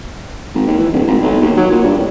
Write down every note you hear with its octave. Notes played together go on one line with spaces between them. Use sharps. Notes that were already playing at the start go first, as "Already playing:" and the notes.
G#1
D#2
E3
D1
G#1
B1
D#2
F#3
A#2
G2
A1